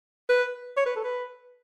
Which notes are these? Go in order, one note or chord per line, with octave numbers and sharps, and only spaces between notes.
B4
C#5
B4
A4
B4